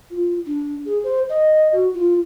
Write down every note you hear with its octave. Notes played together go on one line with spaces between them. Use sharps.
F4
D4
G#4
C5
D#5
F#4
F4